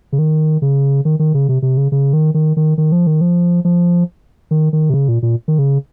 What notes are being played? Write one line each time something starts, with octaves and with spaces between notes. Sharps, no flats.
C#3
D#3
C#3
D#3
D#3
C#3
C3
C3
C#3
C#3
D#3
D#3
D#3
D#3
F3
D#3
F3
F3
D#3
D#3
C3
C#3
A#2
A#2
D#3
C#3